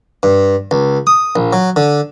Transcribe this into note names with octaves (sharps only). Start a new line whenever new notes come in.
G2
C#2
D#6
A#1
F#3
D3